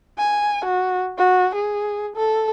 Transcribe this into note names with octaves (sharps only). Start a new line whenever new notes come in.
G#5
F#4
F#4
G#4
A4